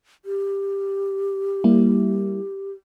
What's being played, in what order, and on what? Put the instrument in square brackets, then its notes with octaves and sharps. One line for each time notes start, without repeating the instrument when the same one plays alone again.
[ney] G4
[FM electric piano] G3 A#3 E4